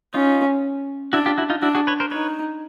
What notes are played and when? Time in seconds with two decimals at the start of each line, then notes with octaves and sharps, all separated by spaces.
0.14 C#4 D#4 F4
1.13 D4 E4 F#4
1.26 F4 G4
1.38 E4 F#4
1.50 D#4 F4
1.62 D4 E4 F#4
1.75 F#4 G#4
1.87 B4 C#5
2.00 A#4 C5
2.11 D#4 B4 C#5